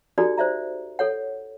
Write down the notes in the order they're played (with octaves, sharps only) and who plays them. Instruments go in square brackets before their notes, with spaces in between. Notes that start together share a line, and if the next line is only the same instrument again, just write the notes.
[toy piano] D#4 F#4 G4 A4 D5 A#5
C5 D5 E5 A#5
A4 C#5 F#5